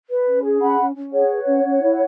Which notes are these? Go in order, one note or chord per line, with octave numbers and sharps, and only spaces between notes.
B4
C#4
G#4
C#4 F#5 B5
C#4
C#4
G#4 C#5 F#5
B4
C#4
C#4
E4